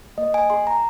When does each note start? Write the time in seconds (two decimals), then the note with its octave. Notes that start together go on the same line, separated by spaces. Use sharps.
0.18 A#3 D#5
0.34 G#5
0.50 G#4 C6
0.67 A#5